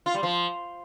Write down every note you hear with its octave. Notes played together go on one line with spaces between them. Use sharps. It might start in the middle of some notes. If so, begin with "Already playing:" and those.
F4
G3
F3